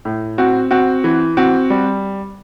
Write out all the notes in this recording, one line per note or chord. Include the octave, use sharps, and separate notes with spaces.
A2
C4 F#4
C4 F#4
E3
C4 F#4
G3